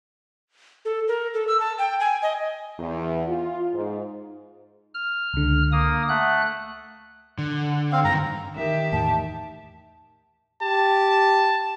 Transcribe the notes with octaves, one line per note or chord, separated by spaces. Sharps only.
A4
A#4
A4
E6
A5
G5
G#5
D#5
E2
F4
G#2
F6
C#2 D3
A#3 D#6
A3 F#5 F#6
D3
C4 F5
G2 D#3 A#5
D#3 G4 E5
E2 A2 A5
G4 A5